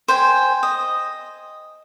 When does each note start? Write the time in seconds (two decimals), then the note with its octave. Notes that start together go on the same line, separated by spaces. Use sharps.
0.08 C5 G5 G#5
0.63 D#5